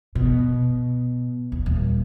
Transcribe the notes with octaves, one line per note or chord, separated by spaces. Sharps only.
B2
D#2
D#1